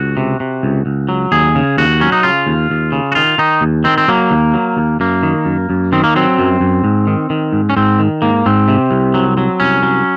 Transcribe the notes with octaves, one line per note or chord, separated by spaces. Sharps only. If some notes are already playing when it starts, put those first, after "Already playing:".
Already playing: C#2 F#4
C3
C3
C#2
C#2
F#3
D#2 G#4
C#3
D#2 F#4
F#3 C#4
D#4
C#3 F4
D#2
D#2
C#3
F#4
D#3 F4
D#3 D#4
D#2
D#3 C4
C4
F#3 A#3
D#2
F#3
D#2
F#2 A#3
D#3
F#2
F#2
D#3 C4
A#3
F#3 C4
F#2
F#2
G#2
D#3
D#3
G#2
C#4
G#2 C4
D#3
G#2 A#3
G#2 C4
C3
C2
F#3
F#3
C2 C#4
F#3